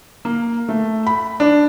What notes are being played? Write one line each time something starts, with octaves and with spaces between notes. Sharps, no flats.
A#3
A3
B5
D4